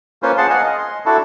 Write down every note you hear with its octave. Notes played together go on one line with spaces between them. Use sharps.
A#3 C#4 F4 B4 C5
G#4 F#5 A5 C6
D#5 F5 F#5 G#5
D#5
C6
D4 E4 F#4 A4